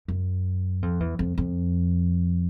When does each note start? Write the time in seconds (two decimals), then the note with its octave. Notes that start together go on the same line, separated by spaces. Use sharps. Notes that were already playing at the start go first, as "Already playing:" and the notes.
0.08 F#2
0.82 F2
1.00 E2
1.19 F2
1.38 F2